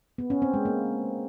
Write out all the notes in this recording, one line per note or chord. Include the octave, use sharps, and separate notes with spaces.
B3
C#4
C4
G#3
A#3